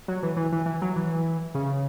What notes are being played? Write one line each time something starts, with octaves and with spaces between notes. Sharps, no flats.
F#3
E3
E3
E3
E3
F#3
E3
C#3